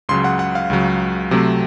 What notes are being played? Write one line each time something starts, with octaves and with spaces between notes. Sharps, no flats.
C#2 C#3 F#3 C6
F#5
F#5
F5
C#2 C#3 F#3
C3 F#3 A3 C4